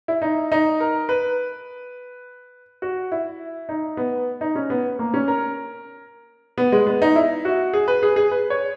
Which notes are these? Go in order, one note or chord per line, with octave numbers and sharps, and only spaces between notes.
E4
D#4
D#4
A#4
B4
F#4
E4
D#4
B3
D#4
C#4
B3
A#3
C#4
A#4
B3
G#3
B3
D#4
E4
F#4
G#4
B4
G#4
G#4
B4
C#5